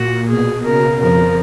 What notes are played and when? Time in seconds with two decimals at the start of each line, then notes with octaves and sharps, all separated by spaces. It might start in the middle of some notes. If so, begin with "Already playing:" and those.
Already playing: A#2 F#4
0.29 B2 G#4
0.65 C#3 A#4
1.01 F2 F3 A#4